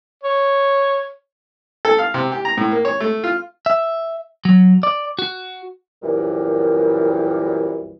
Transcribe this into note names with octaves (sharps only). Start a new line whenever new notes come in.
C#5
A4
F5
C3
G4
A#5
A2
A#3
C#5
A3
F4
E5
F#3
D5
F#4
C2 F#2 A#2 E3 G3